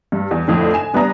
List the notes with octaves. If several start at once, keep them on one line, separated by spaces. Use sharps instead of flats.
G2
E2
F2 A2 D3
G#5 E7
G3 B3 D4 G#5 A#5 D#6